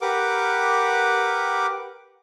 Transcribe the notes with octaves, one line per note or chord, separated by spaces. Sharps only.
G4 A#4 B4 F#5 D6